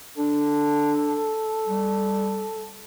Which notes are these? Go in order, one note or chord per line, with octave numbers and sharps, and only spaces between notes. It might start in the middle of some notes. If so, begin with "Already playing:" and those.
D4 A4
G3